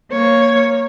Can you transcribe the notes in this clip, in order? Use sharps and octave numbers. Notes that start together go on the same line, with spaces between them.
A#3 C#5